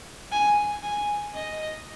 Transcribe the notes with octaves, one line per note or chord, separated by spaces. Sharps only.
G#5
G#5
D#5